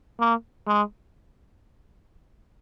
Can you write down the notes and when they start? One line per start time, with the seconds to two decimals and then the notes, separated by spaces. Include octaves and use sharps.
0.20 A#3
0.67 G#3